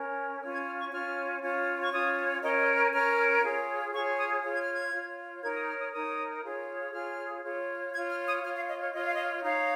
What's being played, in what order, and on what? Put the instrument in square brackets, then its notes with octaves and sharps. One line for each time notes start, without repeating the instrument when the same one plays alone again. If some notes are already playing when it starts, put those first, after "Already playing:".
Already playing: [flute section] C#4 A#4 C#5
C#4 F4 C#5 F6
G#6
F6
C#6
C#4 F4 C#5 F6
C#4 F4 C#5
C#6
C#4 F4 C#5 D#6
C#4 A#4 C#5 D#5
D#5
F6
C#4 A#4 C#5 F6
F4 G#4 C#5
F4 G#4 C#5 C#6
D#6
F4 C#5
G#6
F6
G#6
F4 C#5
D#4 A#4 C#5 G#6
D#6
F6
D#6
D#4 A#4 C#5 D#6
F4 G#4 C#5
F4 G#4 C#5 F6
F4 C#5
F4 G#6
C#5
F6
D#6
F4 F6
C#5
F5
D#5
C#5
F4 C#5 D#5
F5
D#5
D#4 C#5 F5